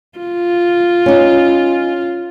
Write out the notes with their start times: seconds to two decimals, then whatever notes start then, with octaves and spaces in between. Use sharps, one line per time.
0.18 F4
1.06 C#4 D#4